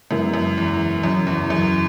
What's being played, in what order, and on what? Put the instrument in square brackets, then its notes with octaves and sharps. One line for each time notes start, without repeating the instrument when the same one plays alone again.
[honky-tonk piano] F#2 [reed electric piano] C#3 G#3 B3 E4 A#4
[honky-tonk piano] F#2
E2
[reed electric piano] C#2 C#3 F#3 C#4 [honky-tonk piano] F#2
[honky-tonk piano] E2
F#2